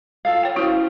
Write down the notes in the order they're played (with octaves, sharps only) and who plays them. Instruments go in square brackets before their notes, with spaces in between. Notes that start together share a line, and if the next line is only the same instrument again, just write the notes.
[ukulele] F4 A4 F5
[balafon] C#5 G5
[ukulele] C#4 C5 [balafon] E4 F#4